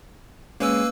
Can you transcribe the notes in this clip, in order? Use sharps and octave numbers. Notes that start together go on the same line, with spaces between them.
G#3 A#3 C#4 B4 E6